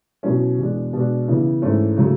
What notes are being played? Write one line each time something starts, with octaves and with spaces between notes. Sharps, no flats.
B2 F#3 C#4 E4
E2 B2 G#3 D4
B2 G#3 D4
C#3 E3 B3 E4
G#2 E3 A3 C#4 E4
C#3 F#3 A3 E4